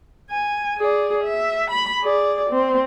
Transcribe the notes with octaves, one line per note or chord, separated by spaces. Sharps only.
G#5
G#4 D5
E5
B5
G#4 D5
C4